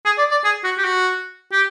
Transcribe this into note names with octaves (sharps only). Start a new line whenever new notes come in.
G#4
D5
D5
G#4
F#4
G4
F#4
G4